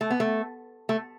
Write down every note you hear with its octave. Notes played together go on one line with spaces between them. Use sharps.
A3
B3
A3
A3